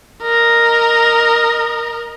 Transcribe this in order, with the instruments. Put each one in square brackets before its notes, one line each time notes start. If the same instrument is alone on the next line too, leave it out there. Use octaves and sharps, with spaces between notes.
[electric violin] A#4 D#5